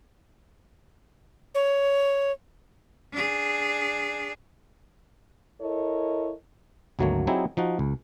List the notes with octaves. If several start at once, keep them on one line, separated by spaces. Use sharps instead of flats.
C#5
D4 G#4
E4 A4 A#4 C#5 D#5
G#1 D2 F#3 A3 A#3 C#5
F#3 C4 D#4 E4 G4 G#4
F3 D#4 F#4
C#2